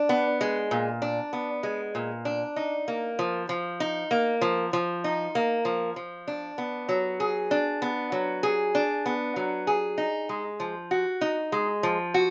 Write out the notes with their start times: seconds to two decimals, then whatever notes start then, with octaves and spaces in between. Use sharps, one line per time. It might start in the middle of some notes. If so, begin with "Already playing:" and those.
Already playing: D4
0.09 B3
0.41 G#3
0.71 A#2
1.02 D4
1.33 B3
1.63 G#3
1.95 A#2
2.25 D4
2.56 D#4
2.88 A#3
3.19 F3
3.49 F3
3.80 D#4
4.11 A#3
4.41 F3
4.73 F3
5.04 D#4
5.35 A#3
5.65 F3
5.96 F3
6.28 D4
6.58 B3
6.89 F#3
7.20 G#4
7.51 D4
7.82 B3
8.12 F#3
8.43 G#4
8.75 D4
9.06 B3
9.36 F#3
9.67 G#4
9.98 D#4
10.29 G#3
10.60 F3
10.91 F#4
11.21 D#4
11.52 G#3
11.83 F3
12.14 F#4